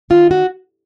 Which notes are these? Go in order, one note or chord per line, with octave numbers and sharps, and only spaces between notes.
D#3 F4
F#4